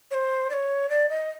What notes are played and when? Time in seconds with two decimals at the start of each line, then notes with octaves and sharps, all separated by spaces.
0.11 C#5
0.14 C5
0.50 D5
0.54 C#5
0.89 D5
1.09 D#5